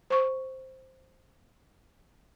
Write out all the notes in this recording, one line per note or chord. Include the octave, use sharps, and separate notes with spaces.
C5 C#6